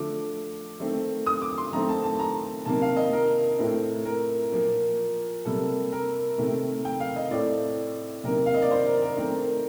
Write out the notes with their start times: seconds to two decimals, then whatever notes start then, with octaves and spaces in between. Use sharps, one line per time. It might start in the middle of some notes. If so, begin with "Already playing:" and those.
Already playing: D3 F3 A3 D6
0.80 D#3 A3 C4
1.26 D#6
1.42 D6
1.58 C6
1.73 D#3 A3 C4 A#5
1.89 A5
2.04 A5
2.20 A#5
2.65 C3 D#3 A#3 A5
2.82 F5
2.97 D#5
3.13 A#4
3.59 A2 A3 C4
4.05 A#4
4.52 A#2 F3 A#3
5.45 C3 G3 A#3 A4
5.92 A#4
6.38 C3 D#3 A3
6.85 G5
7.00 F5
7.16 D#5
7.31 A2 A3 C4 D5
8.24 C3 D#3 A#3 A#4
8.46 F5
8.54 D#5
8.62 D5
8.71 C5
8.87 A#4
9.02 A#4
9.17 D#3 A3 C4 A#4